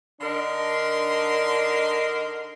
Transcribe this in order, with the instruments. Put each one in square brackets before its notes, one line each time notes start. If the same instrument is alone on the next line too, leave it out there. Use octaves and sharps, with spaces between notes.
[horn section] D3 D4 D#4 A#4 C6